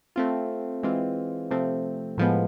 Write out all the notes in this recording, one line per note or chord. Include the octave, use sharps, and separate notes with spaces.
A3 C4 F4
E3 G#3 C4 F4
C3 F3 A3 C4
A2 F3 G#3 B3